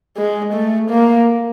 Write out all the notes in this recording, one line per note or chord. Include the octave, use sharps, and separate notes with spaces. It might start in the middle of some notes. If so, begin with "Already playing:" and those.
G#3
A3
A#3